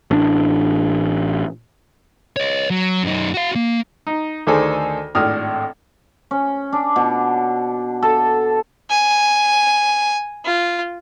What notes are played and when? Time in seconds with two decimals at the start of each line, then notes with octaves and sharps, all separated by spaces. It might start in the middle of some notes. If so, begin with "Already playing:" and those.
0.11 A1 D4
2.36 C#5 D#5
2.70 F#3
3.03 F#2 D#4
3.34 F#4 F5
3.55 A#3
4.07 D#4
4.47 D2 D#3 G#4 A4 C5 G#5
5.15 G#1 A2 D4 D#6 F6
6.31 C#4
6.72 D4
6.96 B2
8.02 A4
8.90 G#5
10.45 F4